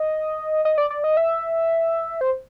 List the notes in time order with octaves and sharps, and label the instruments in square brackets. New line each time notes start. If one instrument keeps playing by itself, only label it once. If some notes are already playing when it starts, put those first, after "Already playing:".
Already playing: [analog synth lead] D#5
D#5
D5
D5
D#5
E5
C5